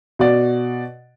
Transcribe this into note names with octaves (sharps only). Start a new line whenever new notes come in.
B2 F#4 D5